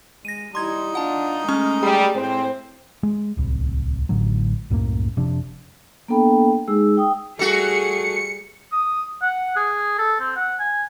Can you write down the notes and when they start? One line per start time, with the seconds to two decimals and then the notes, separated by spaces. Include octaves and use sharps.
0.25 G#3 A#6 D#7
0.55 G3 D#4 E4 C6 G#6
0.95 D4 F4 F#5 A5
1.48 G#3 A3 C#4 C#6 F6
1.83 G3 G#4
2.16 A2 C4 C5
3.03 G#3
3.37 D1 C2
4.09 A1 A2 D3 F#3
4.70 C2 F#2 A2 A#3
5.16 F1 C3 F3 D4
6.08 A#3 B3 D4 A4 G5 B5
6.68 G#3 D#4 G#4 E6
6.97 G5 D#6
7.39 G3 A3 F#4 G#4 C#7
8.73 D#6
9.22 F#5
9.56 G#4
9.99 A4
10.20 C4
10.37 F#5
10.60 G#5